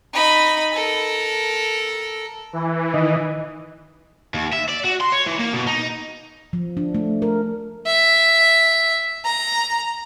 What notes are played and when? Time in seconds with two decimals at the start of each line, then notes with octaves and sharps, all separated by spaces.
0.13 D#4 B5
0.73 A4 A#4
2.53 E3
2.94 D#3 D#5
4.34 D#2
4.53 E5
4.68 D5
4.84 F#4
5.01 C6
5.12 C#5
5.27 E3
5.39 A#3
5.53 B2
5.67 D#4
6.53 F3
6.77 D4
6.95 A3
7.22 A#4
7.87 E5
9.25 A#5